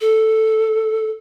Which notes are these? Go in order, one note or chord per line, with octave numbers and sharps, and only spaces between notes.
A4